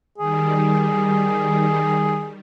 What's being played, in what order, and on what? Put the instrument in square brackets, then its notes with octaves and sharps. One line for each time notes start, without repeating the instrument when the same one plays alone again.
[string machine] D#3 G3 [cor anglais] G#4